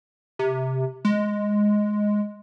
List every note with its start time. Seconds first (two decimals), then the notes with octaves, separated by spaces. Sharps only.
0.39 C3
1.05 G#3